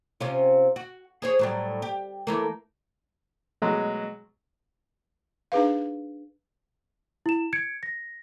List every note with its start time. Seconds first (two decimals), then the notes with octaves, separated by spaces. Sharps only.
0.20 C3 C#4 F4
0.76 F#4
1.22 G#4 C5 C#5
1.39 A2 F#3 G3
1.82 G4
2.27 E3 A3 A#3
3.62 B2 F#3 G#3 A3
5.52 D4 D#4 G#4 B4 F5
7.26 E4 E7
7.53 G#6 C#7 D7
7.83 A#6